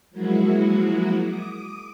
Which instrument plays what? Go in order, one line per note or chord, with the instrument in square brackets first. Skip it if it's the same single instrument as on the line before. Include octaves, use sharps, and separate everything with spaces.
[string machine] F3 F#3 G#3 A#3 E4 F#4
D6 D#6